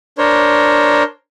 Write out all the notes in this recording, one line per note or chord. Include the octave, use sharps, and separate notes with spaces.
D4 A#4 C5 C#5